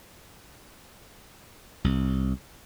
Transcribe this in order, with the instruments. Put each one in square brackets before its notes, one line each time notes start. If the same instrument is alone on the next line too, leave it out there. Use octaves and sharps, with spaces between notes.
[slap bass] C2